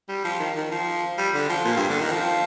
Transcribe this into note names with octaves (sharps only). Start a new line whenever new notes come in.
G3
F3
D#3
D#3
F3
G3
D3
F3
A#2
G2
D3
D#3
F3